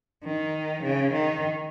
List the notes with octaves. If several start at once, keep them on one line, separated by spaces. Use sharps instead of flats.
D#3
C#3
D#3